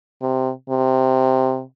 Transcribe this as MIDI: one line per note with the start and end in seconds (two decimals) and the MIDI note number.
0.22 0.51 48
0.70 1.62 48